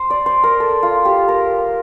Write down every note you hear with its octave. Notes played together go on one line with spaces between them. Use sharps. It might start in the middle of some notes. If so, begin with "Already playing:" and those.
Already playing: C5
D5
C5
A#4
A4
F4
G4
A#4